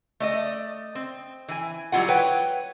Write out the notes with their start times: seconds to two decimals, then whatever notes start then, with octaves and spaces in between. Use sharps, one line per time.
0.20 A3 D5 D#5
0.95 C4
1.48 E3 G#5
1.92 F#3 G3 A3 E4 F4 F#5
2.09 B4 C#5 F#5 G5